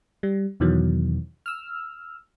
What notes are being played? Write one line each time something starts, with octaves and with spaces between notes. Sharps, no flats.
G3
E2 B2 D#3 E3 F#3
E6 F6